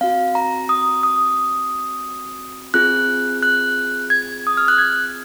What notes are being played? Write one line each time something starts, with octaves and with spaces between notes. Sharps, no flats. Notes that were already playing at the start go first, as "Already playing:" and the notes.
C4 F#4 F5
A#5
D#6
D#6
C4 F4 G#4 F#6
F#6
G#6
D#6
F6
F#6
G#6